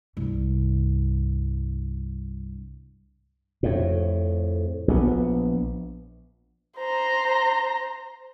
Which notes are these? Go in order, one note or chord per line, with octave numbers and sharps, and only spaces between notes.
C2 G2
F2 A2
A#1 B3
C5 A#5